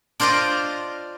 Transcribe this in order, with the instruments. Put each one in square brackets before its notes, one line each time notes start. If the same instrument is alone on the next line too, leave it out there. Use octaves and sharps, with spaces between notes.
[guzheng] D4 F4 C5 D5 D#5